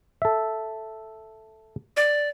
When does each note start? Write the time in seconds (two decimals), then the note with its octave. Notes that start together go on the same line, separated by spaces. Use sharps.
0.22 A4 E5
1.97 D5